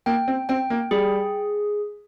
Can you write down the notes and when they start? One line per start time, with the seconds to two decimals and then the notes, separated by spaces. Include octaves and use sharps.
0.06 A#3 G5
0.28 C4
0.49 C4 G5
0.70 A#3
0.91 G3 G#4